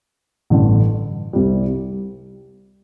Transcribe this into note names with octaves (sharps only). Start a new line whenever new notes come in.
A1 G2 D3
C2 C3 G3